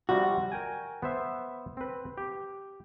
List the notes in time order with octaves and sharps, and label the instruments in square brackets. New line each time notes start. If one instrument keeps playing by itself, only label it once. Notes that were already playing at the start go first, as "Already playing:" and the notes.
[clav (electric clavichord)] C3 F3 G3 [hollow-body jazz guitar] F#4
[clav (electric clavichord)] A#4 G5 G#5
B3 C5 E5
C4 B4
G4